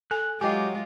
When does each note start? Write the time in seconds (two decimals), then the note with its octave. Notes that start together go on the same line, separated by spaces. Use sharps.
0.11 A4 G#5 F#6
0.41 F#3 G#3 F4 G4 D#5 G5 G#5 D6